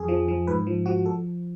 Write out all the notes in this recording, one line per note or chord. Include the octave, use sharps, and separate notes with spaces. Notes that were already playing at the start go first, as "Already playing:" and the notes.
Already playing: F2 G#4
F3
F3
G#2 B4
F3
F3 F#4
A4